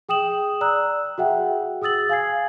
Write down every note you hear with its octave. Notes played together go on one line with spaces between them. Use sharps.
G#4 G5 D#6 E7 F#7
D5 A#5 E6 F#6
F#4 G#4 E5 F#5 G5
G#4 D#6 E6 A6 F#7
F5 G#5 G#6 C7